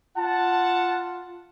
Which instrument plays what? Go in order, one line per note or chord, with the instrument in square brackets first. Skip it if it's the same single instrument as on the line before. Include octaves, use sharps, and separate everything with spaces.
[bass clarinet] F4 [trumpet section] F#5 A5